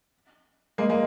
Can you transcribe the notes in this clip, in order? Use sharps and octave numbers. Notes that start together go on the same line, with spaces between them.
G#3 A#3
G#3 A#3